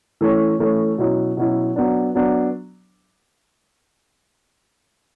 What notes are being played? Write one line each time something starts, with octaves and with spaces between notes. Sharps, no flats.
E3 A3 C#4
E3 A3 C#4
B2 F#3 C#4 E4
B2 F#3 C#4 E4
F#3 B3 D4
F#3 B3 D4